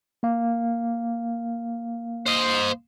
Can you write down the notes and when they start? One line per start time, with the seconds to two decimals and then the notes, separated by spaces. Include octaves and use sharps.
0.23 A#3 F5
2.26 C5 D#5